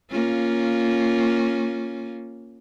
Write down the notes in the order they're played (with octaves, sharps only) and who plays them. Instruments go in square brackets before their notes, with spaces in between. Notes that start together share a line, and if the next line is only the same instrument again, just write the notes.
[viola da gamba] A#3 C#4 F4